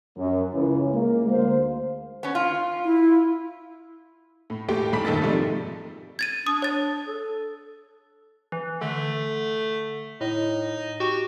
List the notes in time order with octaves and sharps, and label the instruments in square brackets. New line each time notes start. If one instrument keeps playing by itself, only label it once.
[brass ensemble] F#2
C#2 C#3 E3
G#3 A#3
D2 C5 F5
[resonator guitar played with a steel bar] B3 C#4
F4
[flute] E4
[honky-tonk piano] A2
A2 G#3 A3 G4 G5
C2 G#2 B5 B6
G1 D#3 D#4 A4 A6
G#2 C3 F3 G3 A3
[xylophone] G#6 A6 D#7
[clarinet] D4 [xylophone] D#6
[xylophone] C#5 A6
[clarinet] A4
[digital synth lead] E3
[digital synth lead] D3 [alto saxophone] A3
[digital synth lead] A2 [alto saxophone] D#4
[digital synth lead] F#4 [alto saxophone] G4